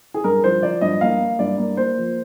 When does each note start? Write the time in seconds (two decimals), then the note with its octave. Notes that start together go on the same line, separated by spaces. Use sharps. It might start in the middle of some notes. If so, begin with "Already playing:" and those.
0.14 G#4
0.24 G2 A#4
0.44 F3 C5
0.62 F3 D5
0.81 G2 D#5
1.01 A#3 F5
1.20 A#3
1.39 G2 D5
1.58 A#3
1.77 A#3 C5
1.97 F3